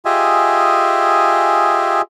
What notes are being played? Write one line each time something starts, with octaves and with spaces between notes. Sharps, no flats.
F4 G4 G#4 D#5 E5 G#5